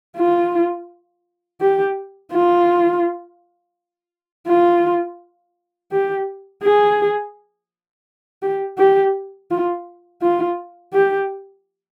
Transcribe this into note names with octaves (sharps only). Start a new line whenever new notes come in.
F4
G4
F4
F4
G4
G#4
G4
G4
F4
F4
G4